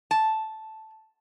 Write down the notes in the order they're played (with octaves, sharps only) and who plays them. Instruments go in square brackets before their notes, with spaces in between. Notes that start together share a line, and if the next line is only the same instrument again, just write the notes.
[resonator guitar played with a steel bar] A5